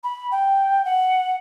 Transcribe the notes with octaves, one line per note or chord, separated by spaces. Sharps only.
B5
G5
F#5